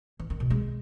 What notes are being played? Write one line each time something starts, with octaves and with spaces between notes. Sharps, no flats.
E3
D#3
B2
G#3